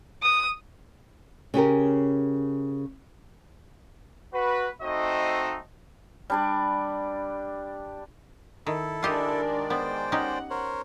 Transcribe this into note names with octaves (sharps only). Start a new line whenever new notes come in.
D#6
C#3 C#4 G4 A#4
F#4 B4
A3 C4 D#4 F#4 C5 D#5
G3 D4 D5
D#3 E4 A4
D#3 G#3 D4 F4 G4 A#4 D5 D#5
B3 C5 G5
C#4 D#4 G4 F#5
A#4 C5 C#5